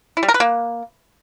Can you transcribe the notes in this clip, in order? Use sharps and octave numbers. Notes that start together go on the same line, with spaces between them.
E4
G3
A#4
B4
A#3